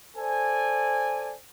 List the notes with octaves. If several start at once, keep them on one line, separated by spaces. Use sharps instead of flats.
A4 C5 D5 G#5